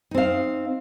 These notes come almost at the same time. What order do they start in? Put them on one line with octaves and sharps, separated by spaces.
D#4 C4 F5